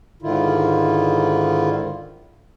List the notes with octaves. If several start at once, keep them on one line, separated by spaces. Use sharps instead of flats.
G#2 D3 D#3 E4 F4